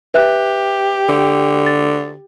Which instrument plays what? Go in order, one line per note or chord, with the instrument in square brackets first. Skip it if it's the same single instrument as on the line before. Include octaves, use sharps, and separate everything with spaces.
[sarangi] G4 [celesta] B4 E5 F#6
[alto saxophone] D3
[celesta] A6